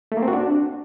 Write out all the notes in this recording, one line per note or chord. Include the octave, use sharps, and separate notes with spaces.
A3
A#3
C4
F#4
D4